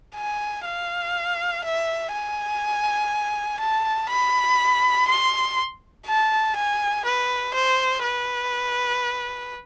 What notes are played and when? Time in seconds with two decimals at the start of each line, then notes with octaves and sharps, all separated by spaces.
0.16 G#5
0.65 F5
1.64 E5
2.13 G#5
3.60 A5
4.10 B5
5.08 C6
6.06 A5
6.56 G#5
7.05 B4
7.54 C5
8.03 B4